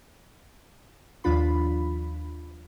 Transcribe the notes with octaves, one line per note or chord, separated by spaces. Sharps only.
D#2 F3 D4 F4 B5